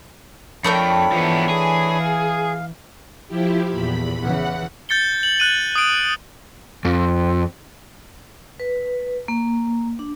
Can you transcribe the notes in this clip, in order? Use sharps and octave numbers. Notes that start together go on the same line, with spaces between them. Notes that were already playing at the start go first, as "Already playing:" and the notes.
F2 F3 A3 D4 A#4 C#5 G5 B5
E3 F3 B3
G#4
F5
F3 E4 G4
E2 A#2 B5
E2 C#3 E3 F#5
G6 A6 C#7 G7
F#7
F#6 D#7 F#7
D#6 D7
F2
B4
A#3
D4